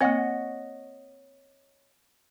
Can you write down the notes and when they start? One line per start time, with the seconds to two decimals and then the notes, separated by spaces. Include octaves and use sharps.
0.01 A#3 C4 C#5 D#5 F#5